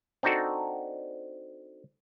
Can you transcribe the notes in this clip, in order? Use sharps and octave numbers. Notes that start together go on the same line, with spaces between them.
C4 D4 D#4 F#4 A4